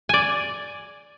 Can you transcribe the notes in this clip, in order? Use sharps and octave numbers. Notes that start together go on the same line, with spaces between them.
D5 G#5